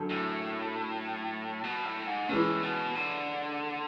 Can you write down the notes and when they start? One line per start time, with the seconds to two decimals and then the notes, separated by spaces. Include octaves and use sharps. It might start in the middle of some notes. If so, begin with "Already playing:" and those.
Already playing: F#2 D3 A4
0.10 A2
1.64 B2
1.85 A2
2.07 G#2
2.29 A2 E3 G#3 C#4
2.62 B2
2.95 D3